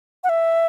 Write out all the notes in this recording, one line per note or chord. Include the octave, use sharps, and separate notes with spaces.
F#5
E5